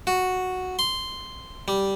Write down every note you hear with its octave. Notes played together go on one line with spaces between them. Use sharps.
F#4
C6
G3